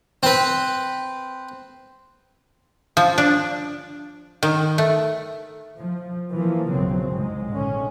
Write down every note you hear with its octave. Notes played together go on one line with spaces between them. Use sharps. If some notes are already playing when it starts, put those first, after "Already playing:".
C4 B4
F3
D4
D#3
A3
F3
E3 F3 A#3
B1 F#2 C#3 F#3 C4
C2 G#2 G#3
A#1 D3 C#4